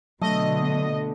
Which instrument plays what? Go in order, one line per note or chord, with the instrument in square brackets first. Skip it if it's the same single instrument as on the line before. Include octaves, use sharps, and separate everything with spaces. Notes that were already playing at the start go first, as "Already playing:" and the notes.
[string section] B2 D3 [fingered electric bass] F#3 [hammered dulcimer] A3 [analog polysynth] D#5